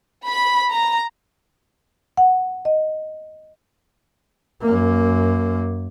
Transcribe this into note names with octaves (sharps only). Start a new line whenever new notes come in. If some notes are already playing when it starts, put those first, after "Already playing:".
B5
A#5
F#5
D#5
F#2 A#3